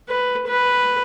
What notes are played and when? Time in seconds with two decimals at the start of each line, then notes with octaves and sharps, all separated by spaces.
0.09 B4
0.48 B4